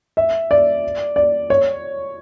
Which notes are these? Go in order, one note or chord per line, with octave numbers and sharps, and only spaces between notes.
E5
D5
D5
C#5